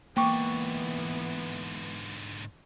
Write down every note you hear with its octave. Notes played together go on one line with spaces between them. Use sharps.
G#2 D3 E3 A#3 B3 G5 C#6 D6